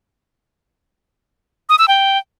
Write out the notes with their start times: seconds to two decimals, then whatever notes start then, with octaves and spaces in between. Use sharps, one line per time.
1.69 D#6
1.79 E6
1.88 G5